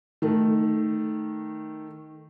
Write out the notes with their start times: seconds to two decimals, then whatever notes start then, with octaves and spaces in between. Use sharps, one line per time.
0.22 D#3 A3